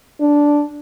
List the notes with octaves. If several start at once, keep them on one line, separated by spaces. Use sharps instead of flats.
D4